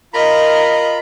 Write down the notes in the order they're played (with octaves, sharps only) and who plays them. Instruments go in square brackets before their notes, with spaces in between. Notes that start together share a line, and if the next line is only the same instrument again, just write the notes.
[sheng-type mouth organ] F4 A#5 B5 [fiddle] A#4 D#5